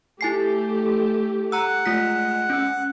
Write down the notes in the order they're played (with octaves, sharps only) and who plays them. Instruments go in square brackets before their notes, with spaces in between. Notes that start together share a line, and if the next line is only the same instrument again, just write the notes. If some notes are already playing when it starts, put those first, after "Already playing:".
[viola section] A3 G4 [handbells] E4 G#5 C7
[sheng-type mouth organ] F#5 [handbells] A#5 E6
[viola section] G#3 [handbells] A3 F4 B6
[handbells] C#4 E6